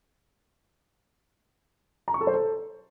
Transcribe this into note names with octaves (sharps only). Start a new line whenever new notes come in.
A#5
C#6
A4
C5
A4